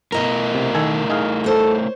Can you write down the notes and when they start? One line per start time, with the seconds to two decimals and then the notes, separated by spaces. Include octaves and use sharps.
0.12 B2 A3 E4 A#4 D#5 A#5
0.54 C3
0.75 D#3 A4 G#5
1.10 D#4 G#4 F5
1.44 A4 C5 C#5